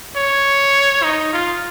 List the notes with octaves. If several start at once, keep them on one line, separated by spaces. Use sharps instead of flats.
C#5
D#4
F4